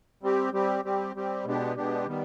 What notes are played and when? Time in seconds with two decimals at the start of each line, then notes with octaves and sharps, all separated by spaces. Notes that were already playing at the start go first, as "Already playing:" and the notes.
0.23 G3 C4 G4
0.53 G3 C4 G4
0.84 G3 C4 G4
1.15 G3 C4 G4
1.45 B2 G#3 B3 D4 G4
1.76 B2 G#3 B3 D4 G4
2.07 D#3 G3 B3